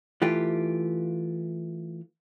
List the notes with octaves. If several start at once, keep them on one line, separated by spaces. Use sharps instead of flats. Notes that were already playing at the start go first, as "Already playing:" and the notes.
E3 A3 F4 G4